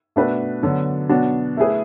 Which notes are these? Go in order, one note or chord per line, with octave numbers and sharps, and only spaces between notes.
B2 A3 D4 F#4 B4
D3 F#3 B3 D4
B2 F#3 B3 D4 F#4
A3 E4 G#4 B4